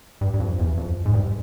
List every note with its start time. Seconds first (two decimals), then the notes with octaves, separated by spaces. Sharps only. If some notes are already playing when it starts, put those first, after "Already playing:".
0.21 G2
0.34 G2
0.40 F2
0.59 E2
0.77 F2
1.06 G#2
1.14 G2